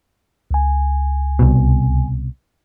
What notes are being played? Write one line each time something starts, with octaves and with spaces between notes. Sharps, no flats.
C#2 G#5
C2 B2